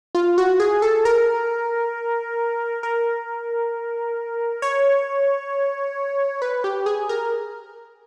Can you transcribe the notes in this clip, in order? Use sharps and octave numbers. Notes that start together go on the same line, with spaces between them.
F4
F#4
G#4
A4
A#4
A#4
C#5
B4
G4
G#4
A#4